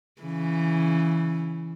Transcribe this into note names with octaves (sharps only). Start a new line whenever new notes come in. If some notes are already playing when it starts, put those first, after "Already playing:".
C#3 E3